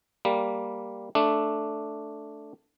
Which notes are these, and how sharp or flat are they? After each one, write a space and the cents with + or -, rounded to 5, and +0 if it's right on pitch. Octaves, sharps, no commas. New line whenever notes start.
G3 +0 A#3 +0
A3 +0 D4 +0